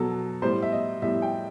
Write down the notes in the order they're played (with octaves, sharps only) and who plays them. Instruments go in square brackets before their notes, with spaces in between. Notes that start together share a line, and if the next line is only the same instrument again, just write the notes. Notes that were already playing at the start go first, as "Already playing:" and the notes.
Already playing: [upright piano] B2 F#3 A4
A2 G3 C5
E5
D#5
A2 G3 E5
G5